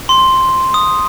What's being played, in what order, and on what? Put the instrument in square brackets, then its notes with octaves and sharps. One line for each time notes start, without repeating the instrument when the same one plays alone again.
[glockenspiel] C6
D#6